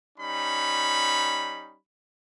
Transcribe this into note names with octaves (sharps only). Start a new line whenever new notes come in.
G3 C#4 D#4 B5